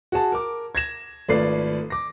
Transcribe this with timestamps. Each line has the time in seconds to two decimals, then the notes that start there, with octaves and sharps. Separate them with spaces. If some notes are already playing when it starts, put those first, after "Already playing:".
0.12 F#4 G#4 A5
0.32 A#4 D6
0.75 G#6 A#6 E7
1.29 G#1 A3 F4 B4 D5 C7
1.90 D6 A#6